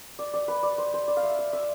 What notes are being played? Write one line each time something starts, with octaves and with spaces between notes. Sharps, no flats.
D5
D5
B4
D5
C5
C5
D5
F5
E5
E5
E5